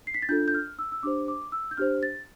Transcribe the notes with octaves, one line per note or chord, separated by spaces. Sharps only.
C7
B6
A6
D4 F4 A4 G6
G6
F6
E6
E6
D4 G4 C5 D6
D6
E6
G6
D4 G4 C5 F6
A6